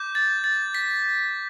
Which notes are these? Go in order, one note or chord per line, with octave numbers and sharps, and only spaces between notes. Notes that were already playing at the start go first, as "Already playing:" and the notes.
Already playing: D6 G6
A6
A6
B6